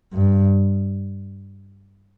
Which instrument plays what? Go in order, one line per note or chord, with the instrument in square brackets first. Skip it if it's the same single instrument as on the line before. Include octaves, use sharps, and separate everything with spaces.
[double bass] G2